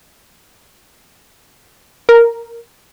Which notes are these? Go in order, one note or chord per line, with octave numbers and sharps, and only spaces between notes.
A#4